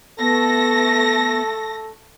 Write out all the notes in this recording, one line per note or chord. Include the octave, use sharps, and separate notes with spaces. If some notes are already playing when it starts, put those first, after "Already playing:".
A3 B3 A4 A#6